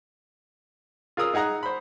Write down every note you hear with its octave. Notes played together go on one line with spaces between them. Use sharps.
F4 G#4 A#4 D#6 E6
D#4 G#4 F#5 A#5 D#6
C5 B5